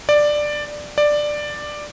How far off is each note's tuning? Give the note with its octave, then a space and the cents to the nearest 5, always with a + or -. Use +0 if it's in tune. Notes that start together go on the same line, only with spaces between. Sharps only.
D5 +10
D5 +10